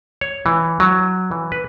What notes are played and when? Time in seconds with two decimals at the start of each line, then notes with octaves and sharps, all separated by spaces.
0.21 C#5
0.46 E3
0.80 F#3
1.31 E3
1.52 B4